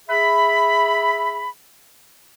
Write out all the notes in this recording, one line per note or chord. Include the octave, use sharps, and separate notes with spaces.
G#4 E5 B5